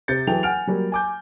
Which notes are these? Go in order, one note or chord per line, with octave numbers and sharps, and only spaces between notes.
C3 C5 G6 A6 C#7
E3 F#3 G#4 A4 G5 F7
F#5 G#5 F6 D7 F7
F#3 G3 A#3
G#5 D6 G6